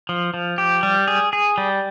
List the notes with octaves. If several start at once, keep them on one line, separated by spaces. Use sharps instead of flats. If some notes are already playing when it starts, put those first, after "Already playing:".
F3
F3
G4
G3
G#4
G#4
G3